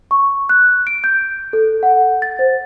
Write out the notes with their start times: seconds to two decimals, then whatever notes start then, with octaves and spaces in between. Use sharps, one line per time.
0.11 C#6
0.49 F#6
0.87 D7
1.04 G6
1.53 A4
1.83 F#5
2.22 A6
2.39 C5